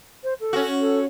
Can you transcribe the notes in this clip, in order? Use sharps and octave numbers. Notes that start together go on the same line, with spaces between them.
C5
A4
C#4 F#4
A4